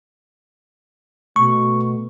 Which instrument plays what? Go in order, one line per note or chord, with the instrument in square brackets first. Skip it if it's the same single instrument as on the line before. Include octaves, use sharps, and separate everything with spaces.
[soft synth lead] B2 [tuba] A3 [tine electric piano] C#6